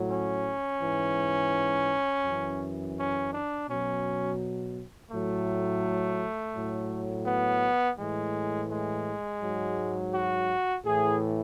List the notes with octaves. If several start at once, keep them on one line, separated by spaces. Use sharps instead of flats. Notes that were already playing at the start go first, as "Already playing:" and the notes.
Already playing: A2 F#3
C#4
G#2 E3
F#2 E3
C#4
D4
B2 F#3 C#4
A2 F#3 A3
A2 F#3
B3
A2 E3 G#3
G#3
G#2 F#3
F#4
A2 E3 G#4